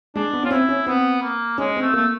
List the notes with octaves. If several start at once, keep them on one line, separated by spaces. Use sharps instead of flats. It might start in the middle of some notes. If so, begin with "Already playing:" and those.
G#3 D4
B3
C#4 F4
C4 E4
C#4
B3 C4
A#3
G#3 C#4
C4
A3
A3 A#3